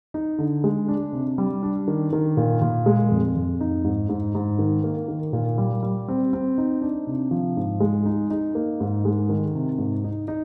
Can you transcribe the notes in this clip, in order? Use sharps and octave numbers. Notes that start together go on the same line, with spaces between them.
D#4
D3
G#3
D4
C3
G3
D4
D#3
D#3
A#2
A#2
G#3
F2
F2
D#4
G#2
G#2
G#2
D#3
A#3
D#3
A#2
G3
G3
C4
C4
D#4
D4
C3
F3
G#2
G#3
D#4
D#4
A#3
G#2
G#3
D#3
C3
G#2
D#4
D#4